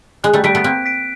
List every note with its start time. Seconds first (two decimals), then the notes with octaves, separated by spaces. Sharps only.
0.24 G#3 F#6
0.34 G3 A3
0.44 G3 A3 B6 D7
0.55 A3 B3
0.64 A#3 C4 F#6
0.86 B6 D7